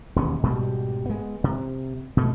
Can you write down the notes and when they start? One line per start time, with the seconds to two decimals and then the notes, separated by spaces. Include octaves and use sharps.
0.16 E1 D#2 C#4
0.43 G#2 B2 G3
1.06 G#3 B3
1.44 C3
2.17 B2 A3